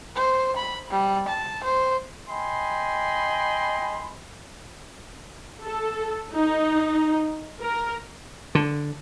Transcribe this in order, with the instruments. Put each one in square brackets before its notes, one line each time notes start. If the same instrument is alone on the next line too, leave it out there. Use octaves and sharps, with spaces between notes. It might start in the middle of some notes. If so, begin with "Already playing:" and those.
[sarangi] C5
B5
G3
A5
C5
[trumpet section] D#5 G5 G#5 B5 C6
[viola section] A4
D#4
A#4
[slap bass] D3